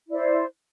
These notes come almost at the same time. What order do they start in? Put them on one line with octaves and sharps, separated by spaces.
E4 D5 C5